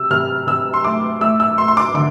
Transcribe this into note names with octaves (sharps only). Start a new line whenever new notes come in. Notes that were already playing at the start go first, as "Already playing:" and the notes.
Already playing: C3 E6
C3 F6
C3 E6
C6
A3 D6
A3 E6
E6
A3 C6
C6
D6
D3 D6